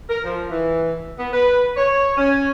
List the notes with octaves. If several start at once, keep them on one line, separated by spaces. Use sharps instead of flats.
A#4
F3
E3
B3
B4
C#5
C#4